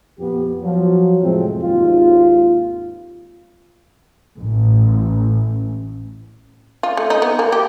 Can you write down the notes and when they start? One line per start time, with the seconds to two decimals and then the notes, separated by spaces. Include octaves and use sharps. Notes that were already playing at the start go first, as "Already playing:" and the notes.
0.19 F2 A#2 B3 G4
0.63 F3 F#3
1.22 F2 A2 C3 G#3 C4
1.62 G#1 D#2 F4
4.37 A1
6.83 F4
6.97 A3
7.10 D#4
7.22 B3
7.39 A#3
7.52 G4